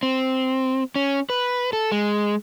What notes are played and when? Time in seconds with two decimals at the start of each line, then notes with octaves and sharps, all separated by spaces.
0.03 C4
0.96 C#4
1.30 B4
1.73 A4
1.92 G#3